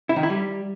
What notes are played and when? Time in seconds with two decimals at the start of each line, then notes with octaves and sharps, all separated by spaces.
0.09 E4
0.16 D#3
0.23 E4
0.30 G3